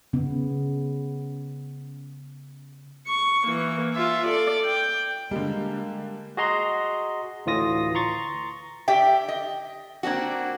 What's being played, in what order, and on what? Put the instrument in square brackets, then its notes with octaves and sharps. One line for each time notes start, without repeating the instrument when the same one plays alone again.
[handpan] C#3 B3
[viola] C#6
E3 A#3
F4 E5
A4 D5
G5
[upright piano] D3 G3 [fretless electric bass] G#3 [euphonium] A#3
[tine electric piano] F#4 G#4 D#5 A#5 C6
D2 A2 E3 F4 D#6 A#6
A#5 C6 C#6 A6
[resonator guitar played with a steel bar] G4 D5 E5 G5
D#5
A#3 C4 D4 F#4